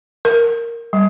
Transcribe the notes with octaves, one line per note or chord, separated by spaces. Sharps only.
A#4
G3